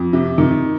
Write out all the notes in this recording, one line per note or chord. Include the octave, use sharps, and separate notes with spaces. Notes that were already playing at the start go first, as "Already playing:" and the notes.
Already playing: F2
C3
D#3